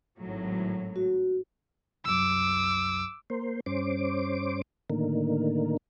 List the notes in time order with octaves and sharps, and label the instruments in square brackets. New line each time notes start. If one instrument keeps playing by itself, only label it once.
[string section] G#1 A2 F#3
[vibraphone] F#4
[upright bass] C2 F#2 [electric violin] D6 E6
[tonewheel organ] A#3 C5
G2 C#4 C5 D6
A2 D3 D#3 A#3